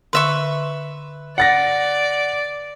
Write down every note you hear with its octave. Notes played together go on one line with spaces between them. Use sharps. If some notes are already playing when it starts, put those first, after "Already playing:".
D3 B4 E5 C6 C#6
D5 F#5 A6 A#6